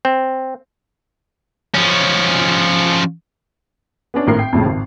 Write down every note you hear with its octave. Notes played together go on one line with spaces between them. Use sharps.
C4
F3 C#4
B3 C#4 D4
G#1 A2 A#4 C7
G5
F2 A2 C#3
G#1